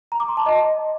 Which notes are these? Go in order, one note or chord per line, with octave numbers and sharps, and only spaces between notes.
A#5
D6
C6
A5
D#5